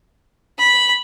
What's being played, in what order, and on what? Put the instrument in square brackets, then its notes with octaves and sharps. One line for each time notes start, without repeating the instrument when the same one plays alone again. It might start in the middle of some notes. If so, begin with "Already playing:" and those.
[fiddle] B5